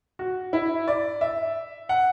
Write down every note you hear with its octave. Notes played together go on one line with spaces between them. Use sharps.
F#4
E4
D5
E5
F#5